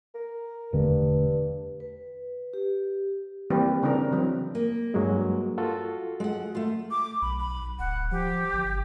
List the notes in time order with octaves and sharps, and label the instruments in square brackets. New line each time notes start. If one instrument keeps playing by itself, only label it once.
[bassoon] A#4
[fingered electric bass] E1 D3 A3 [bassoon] G2
[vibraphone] B4
G4
[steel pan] E3 G3 A#3 C4 G4 B4
C#3 E3 C4 D4 A#4
E3 F#3 C4
[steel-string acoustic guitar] A#3
[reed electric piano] G2 F#3 G#3
F4 F#4 A4
[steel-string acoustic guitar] G#3 F#5
A3 F4
[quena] D6
[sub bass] B1 [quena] B5
[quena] B5
[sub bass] D1 [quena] F#5
[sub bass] F3 [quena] G4
[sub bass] G1